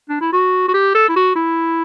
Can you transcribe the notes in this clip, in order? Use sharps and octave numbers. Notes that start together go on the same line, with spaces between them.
D4
E4
F#4
F#4
G4
A4
E4
F#4
E4